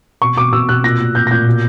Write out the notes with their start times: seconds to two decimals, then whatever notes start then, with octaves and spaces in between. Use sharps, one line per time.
0.22 B2 C#6
0.37 B2 D6
0.52 B2 E6
0.69 B2 F#6
0.84 A#2 A#6
0.99 A#2
1.15 A#2 G6
1.27 A#6
1.31 A#2 G6
1.47 B2